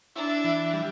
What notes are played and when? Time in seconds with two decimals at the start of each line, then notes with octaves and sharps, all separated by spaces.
0.15 D4 E4
0.44 E3
0.73 G3